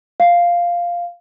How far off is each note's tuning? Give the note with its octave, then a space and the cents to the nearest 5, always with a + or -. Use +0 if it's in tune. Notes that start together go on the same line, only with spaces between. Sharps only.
F5 -5